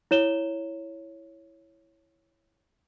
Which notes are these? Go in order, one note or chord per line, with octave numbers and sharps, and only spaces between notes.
E4 C#5 E7 G7